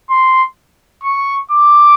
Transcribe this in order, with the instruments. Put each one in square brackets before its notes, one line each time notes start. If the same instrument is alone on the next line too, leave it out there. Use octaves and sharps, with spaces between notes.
[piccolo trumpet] C6
C#6
D6